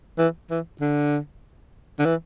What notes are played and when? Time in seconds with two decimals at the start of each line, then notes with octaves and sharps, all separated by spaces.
0.19 E3
0.51 E3
0.81 D3
1.99 D3
2.05 E3